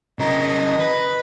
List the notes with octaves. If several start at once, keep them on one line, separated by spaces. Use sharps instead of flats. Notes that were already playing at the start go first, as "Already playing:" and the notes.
C#3 A#4 D#5
B4